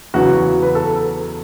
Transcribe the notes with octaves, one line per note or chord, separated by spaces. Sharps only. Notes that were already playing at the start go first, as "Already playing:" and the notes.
E2 C#3 F#3 F#4
B4
A4